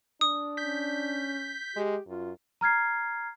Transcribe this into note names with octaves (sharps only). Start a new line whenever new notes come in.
D4 D#6
C#4 G6 B6
G#3 G4
F#2 F4
A#5 F6 G#6 C7